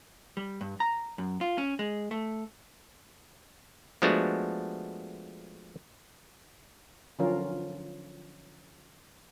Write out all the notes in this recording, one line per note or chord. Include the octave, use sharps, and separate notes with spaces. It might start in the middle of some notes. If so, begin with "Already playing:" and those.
G3
G2
A#5
F#2
F4
C#4
G#3
A3
F3 G#3 A3 B3 D4 F#4
D3 F3 F#3 C#4 F4 A#4